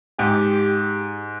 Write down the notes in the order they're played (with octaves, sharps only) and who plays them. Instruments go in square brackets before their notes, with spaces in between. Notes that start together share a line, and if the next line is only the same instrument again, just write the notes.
[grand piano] G#2 [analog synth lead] G4